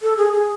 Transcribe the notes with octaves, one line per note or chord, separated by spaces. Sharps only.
A4
G#4
G#4